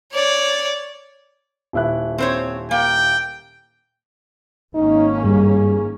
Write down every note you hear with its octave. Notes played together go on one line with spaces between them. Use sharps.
C#5 D5
D#1 E4 F#6
C4 C5 C#5
A#3 G5
G#1 A#3 C#4 D#4
G2 G#4